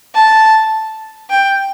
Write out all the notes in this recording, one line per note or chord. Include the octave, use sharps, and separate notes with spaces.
A5
G5